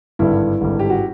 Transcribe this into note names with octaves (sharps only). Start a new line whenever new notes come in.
G#1 G2 D3 G3 E4
G#1 G2 D3 G3
G4
F#4